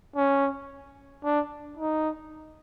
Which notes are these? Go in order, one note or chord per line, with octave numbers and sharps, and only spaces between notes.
C#4
D4
D#4